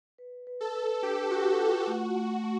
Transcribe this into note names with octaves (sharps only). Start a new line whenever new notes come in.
B4
B4
A4
B4
D4 G4
F#4 B4
F4 F#4
A3 F#4
A3
A3